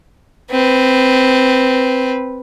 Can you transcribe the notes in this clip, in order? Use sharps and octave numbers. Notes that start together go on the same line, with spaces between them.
C4 B4